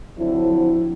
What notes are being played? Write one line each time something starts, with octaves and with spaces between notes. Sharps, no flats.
D3 F3 F#3 C4 E4